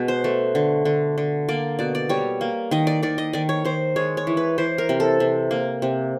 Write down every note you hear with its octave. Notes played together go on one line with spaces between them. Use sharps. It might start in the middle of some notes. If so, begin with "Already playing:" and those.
Already playing: B2 G#3
C5
A3
D3
D3
D3
A#3 D5
B2 D5
D5
G3 C#5
A#3
D#3 D#5
D5
D#3 D5
D#5
D#3 D5
C#5
D#3 C5
G#3 C#5
C#5
E3
B4
E3 C5
A#4
C3
A4
C3
A#3
C3